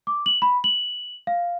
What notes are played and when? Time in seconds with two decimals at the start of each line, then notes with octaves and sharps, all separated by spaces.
0.07 D6
0.26 F#7
0.42 B5
0.64 F#7
1.27 F5